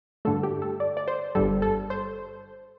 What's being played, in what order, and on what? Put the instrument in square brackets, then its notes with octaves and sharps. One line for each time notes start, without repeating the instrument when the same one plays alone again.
[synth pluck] G2 D3 A3 A4
G4
A4
D5
D5
C5
G1 G2 G3 A4
A4
C5